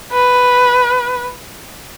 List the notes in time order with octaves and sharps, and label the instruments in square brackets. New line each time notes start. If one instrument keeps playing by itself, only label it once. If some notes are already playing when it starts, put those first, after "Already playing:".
[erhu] B4